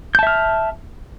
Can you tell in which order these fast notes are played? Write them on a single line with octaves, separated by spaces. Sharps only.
G6 A5 E5 F6